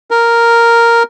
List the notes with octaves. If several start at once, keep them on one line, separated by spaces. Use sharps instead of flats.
A#4